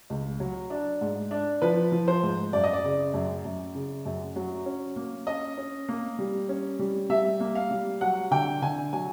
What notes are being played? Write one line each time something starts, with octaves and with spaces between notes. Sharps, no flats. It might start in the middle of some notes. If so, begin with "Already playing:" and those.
C#2
F#3
D4
G#2
D4
F3 B4
F3
C5
G#2
F#2 D5
D#5
D5
C#3
F#2
F#2
C#3
F#2
F#3
C#4
A#3
C#4 D#5
C#4
A#3
G3
C#4
G3
G3 E5
A#3
F5
G3
F#3 F#5
D3 G5
D3 G#5
F#3 G#5